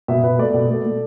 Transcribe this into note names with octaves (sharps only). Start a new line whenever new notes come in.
B2 E5
B2 B4
A3 D5
B2
A3
A3